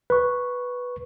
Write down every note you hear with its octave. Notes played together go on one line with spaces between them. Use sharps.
B4 C#6